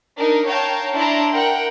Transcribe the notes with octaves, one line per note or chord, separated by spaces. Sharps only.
D4 D#4 A#4
C#5 F5 G5 A5 A#5
D4 E4 A5 A#5 C6 D6
A#4 F#5 G5